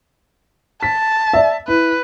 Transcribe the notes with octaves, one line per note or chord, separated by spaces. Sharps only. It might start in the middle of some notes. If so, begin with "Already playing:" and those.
A5 B6
D5 E5
E4 B4